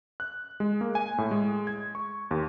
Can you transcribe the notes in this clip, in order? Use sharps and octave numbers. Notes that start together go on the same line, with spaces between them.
F#6
G#3
A#3
G#5
A2
G#3
G#6
C#6
D#2